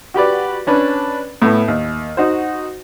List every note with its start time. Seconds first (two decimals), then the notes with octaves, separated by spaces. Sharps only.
0.14 F#4 G4 B4 D5
0.67 C#4 D4 B4
1.42 A2 A3 B3
1.68 D#2
2.17 D#4 F#4 C5